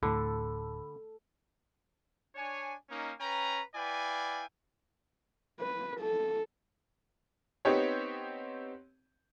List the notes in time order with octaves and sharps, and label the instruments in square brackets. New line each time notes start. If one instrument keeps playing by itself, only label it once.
[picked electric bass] D1 A2 [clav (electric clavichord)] D3 [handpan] A4 [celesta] B5
[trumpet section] D4 C#5 G#5
A#3 C#4 D#4
C#4 B4 G5 A#5
E4 B4 D5 F5 G5 G#5
[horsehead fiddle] B4
A4
[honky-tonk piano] B3 C4 D#4 G4 C#5